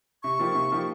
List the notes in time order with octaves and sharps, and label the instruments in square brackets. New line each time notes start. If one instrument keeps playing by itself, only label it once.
[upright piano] C3 [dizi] C#6
[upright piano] F3 A#3 D#4 G4
C3
F3 A#3 D#4 G4